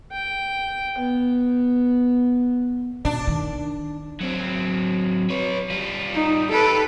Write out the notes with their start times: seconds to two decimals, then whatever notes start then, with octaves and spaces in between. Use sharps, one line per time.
0.12 G5
0.99 B3
3.05 B2 D4
3.27 D#3
4.21 F#3 C4
5.30 B4 C#5
5.70 G3 F4
6.14 D#4
6.51 G4 A4 B4